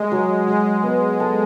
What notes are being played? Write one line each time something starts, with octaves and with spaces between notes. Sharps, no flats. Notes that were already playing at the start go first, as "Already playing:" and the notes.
Already playing: G#3 G#4
F#3
F#3 G#3
B3
A4